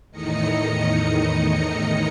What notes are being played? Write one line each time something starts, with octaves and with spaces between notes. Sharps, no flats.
E2 A2 D#3 D#4 D#5 C#7